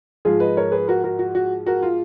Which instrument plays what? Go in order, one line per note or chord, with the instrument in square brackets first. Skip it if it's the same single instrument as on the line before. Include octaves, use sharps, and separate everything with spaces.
[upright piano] G#2 F3 G#3 F4 G#4
B4 D#5
A#4 C#5
G#4 B4
F#4 A#4
F#4 A#4
F#4
F#4
F#4 A#4
F4